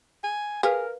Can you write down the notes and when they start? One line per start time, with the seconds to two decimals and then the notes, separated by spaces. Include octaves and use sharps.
0.24 G#5
0.63 G#4 A#4 B4 F5 F6